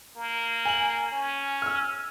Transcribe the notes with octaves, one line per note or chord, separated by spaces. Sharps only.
A#3
G#5 F#7
C#4
E6 F6